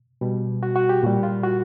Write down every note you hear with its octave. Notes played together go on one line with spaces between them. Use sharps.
B2 G3
F#4
F#4
G4
A#2 G3
F4
F#4